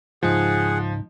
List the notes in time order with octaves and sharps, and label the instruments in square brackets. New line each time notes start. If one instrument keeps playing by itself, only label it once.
[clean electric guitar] C#2 G#2 D#4 [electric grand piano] F3 [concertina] G#4 F#5